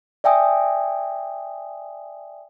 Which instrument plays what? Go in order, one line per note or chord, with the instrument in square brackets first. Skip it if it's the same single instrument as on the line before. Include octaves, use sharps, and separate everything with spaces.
[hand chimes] D5 E5 G5 G#5 D#6